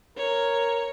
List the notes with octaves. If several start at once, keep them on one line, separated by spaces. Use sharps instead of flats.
A#4 C#5